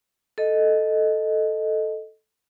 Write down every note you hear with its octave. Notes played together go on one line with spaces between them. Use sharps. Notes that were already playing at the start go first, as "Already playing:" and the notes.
A4 D#5